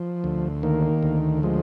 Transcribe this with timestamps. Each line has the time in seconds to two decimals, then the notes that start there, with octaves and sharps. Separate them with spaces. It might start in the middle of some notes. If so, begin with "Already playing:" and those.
Already playing: F3
0.24 D2
0.63 D#3 A#3
1.03 D2
1.43 F3 G#3